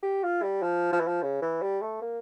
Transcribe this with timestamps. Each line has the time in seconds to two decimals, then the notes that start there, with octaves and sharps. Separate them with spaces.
0.03 G4
0.23 F4
0.43 G3
0.62 F3
0.93 F3
1.00 E3
1.07 F3
1.23 C#3
1.42 E3
1.62 G3
1.81 A3
2.02 A#3